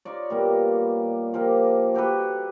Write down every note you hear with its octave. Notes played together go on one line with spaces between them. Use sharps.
D#4 F4 C#5 D5
A#2 G3 A#3 B3
A#2 F3 A#3 G4
F#4 G4 A4 B4